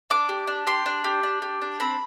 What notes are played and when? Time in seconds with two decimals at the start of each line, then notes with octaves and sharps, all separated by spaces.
0.10 D4 D6
0.29 G4
0.47 D4
0.67 G4 C6
0.86 D4
1.04 G4
1.23 D4
1.42 G4
1.61 D4
1.80 C4 B5